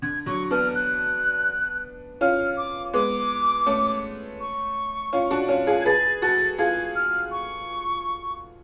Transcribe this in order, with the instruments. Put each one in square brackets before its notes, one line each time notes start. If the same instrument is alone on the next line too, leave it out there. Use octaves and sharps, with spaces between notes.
[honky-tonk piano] D3 [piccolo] G#6
[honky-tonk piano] D3 F#3 [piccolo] C#6
[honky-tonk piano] B3 D4 [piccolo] F6
[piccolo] F#6
[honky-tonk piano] C#4 F4 [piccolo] F6
[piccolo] D6
[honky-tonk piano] G#3 B3 [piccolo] D6
[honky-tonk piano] A3 C#4
[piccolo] C#6
[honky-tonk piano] C#4 F4
D4 F#4
C#4 F4
F4 G#4
[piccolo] G#6
[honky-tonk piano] G#4 B4 [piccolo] A6
[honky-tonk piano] F#4 A4 [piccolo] A6
[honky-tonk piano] F4 G#4 [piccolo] G#6
[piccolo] F6
C#6